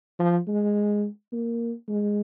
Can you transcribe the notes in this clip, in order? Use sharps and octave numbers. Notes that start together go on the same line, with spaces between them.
F3
G#3
A#3
G#3